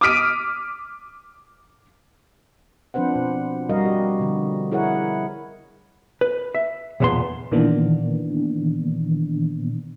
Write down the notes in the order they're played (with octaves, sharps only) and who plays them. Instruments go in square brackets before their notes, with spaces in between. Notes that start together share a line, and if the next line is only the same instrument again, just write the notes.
[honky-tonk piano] D6 D#6 F6 B6 D7 D#7
[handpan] F3 C4 D4 B4 C5 F#5
B2
G3 F#4 A#4 D#5 F5
G4
B2 D3 F3
E4 G#4 A#4 C#5 F#5
[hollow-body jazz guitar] B4
E5
B1 E2 A#2 B3 A5 C6
[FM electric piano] A#2 D#3 E3 A#3 B3 D4